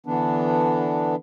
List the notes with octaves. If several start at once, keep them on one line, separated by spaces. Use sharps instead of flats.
D3 E3 B3 D4